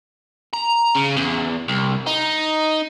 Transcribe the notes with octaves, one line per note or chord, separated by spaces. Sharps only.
A#5
C#3
E2
C2
D#4